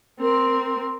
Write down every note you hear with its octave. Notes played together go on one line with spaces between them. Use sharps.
C4 A#4